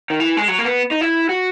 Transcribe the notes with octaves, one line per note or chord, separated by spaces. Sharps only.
D#3
E3
G#3
F#3
A#3
B3
D#4
E4
F#4